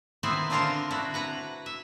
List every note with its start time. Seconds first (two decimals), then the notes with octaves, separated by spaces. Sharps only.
0.23 D#3 B3 C4 E4 G#5
0.50 D3 C4 D4 F4 A#4 A5
0.91 D4 E4 F#4
1.14 B4 F#5 A#5
1.66 E5